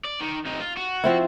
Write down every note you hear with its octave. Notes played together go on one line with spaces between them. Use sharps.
D5
D#3
C3 D#4
F4
F#4
F3 C4 E4